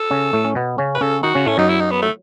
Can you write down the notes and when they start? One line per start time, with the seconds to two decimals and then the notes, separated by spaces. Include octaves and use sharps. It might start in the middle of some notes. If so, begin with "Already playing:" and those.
Already playing: A4
0.11 C#3 C#4
0.33 A2 A3
0.45 C#4
0.55 B2 B3
0.78 C#3 C#4
0.95 B4
1.01 C#3 C#4 A4
1.23 D#3 D#4 F#4
1.35 C#3 C#4
1.46 A2 A3 C#4
1.58 F#2 F#3 D#4
1.69 E4
1.80 D#4
1.91 B3
2.02 A3